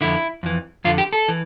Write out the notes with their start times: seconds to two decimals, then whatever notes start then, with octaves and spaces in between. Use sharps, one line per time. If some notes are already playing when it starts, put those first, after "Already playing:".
0.01 F2 D3 E4
0.43 F2 E3
0.84 F2 D3 F4
0.98 G4
1.13 A4
1.28 E3